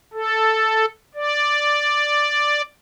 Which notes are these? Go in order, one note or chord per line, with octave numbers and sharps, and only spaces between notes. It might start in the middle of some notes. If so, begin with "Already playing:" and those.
A4
D5